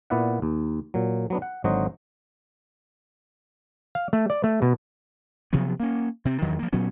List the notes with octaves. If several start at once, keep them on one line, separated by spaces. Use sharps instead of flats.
A#2 B3 E4 D5 E5 F#5
D#2
A#2 F#3
F#3 B3 D4
F#5
G#1 D3 F#3 F#4 C5 D#5
F5
A3
D5
A3
B2
C3 F3 F#3 B3
A#3 C#4
C3 C4
E2 G2 D#3 F#3
F3 A#3
A#2 F#3 B3 C#4